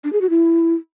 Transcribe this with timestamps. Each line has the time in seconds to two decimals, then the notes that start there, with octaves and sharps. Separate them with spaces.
0.04 D4
0.13 G#4
0.21 F#4
0.30 E4